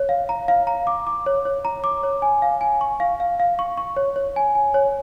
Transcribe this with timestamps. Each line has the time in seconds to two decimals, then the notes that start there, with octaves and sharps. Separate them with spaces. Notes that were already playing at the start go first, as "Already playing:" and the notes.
Already playing: C#5
0.09 F5
0.29 A#5
0.48 F5
0.67 A#5
0.87 D6
1.07 D6
1.26 C#5
1.45 C#5
1.65 A#5
1.84 D6
2.03 C#5
2.22 G#5
2.42 F5
2.61 G#5
2.81 C#6
3.00 F5
3.20 F5
3.40 F5
3.59 C#6
3.77 C#6
3.97 C#5
4.16 C#5
4.36 G#5
4.55 G#5
4.74 C#5